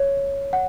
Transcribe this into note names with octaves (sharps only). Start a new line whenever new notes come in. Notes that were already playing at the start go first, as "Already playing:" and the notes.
Already playing: C#5
F#5